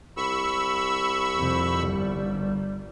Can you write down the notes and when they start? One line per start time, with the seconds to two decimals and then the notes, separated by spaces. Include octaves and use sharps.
0.17 C2 B5 C#6 E6
1.37 F2 C3
1.85 G1 G3